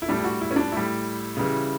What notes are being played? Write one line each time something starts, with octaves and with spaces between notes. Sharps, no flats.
E4
A2 G3 D4
E4
F#4
E4
C#4
D4
A2 G3 E4
C#3 E3 G3